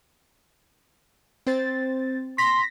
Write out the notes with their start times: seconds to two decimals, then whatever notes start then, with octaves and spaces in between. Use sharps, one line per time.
1.47 C4 C5 A6
2.38 C6 A#6 B6